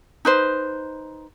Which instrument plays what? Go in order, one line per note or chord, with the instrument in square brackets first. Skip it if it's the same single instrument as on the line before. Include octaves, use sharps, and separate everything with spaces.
[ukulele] D#4 B4 C5